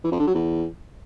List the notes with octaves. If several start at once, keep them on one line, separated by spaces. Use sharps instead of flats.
E3
F2
D3
F#3
E2